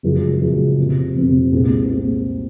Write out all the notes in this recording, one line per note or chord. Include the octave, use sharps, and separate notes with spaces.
F#1 F#2 C#3 F3 G#3
F#1 F#2 C#3 F3 G#3
F1 F2 C3
F1 F2 C3
C2 A#2 G#3 C4
A#2 G#3 C4